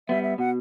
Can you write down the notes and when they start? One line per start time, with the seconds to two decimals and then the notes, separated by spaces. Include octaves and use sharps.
0.09 G3 B3 E5
0.23 E5
0.38 B2 F#5